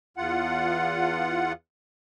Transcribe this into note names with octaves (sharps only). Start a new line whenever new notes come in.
E2 F4 F#5